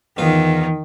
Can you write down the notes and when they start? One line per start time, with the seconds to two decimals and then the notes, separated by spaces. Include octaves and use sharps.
0.18 E2 D#3 F4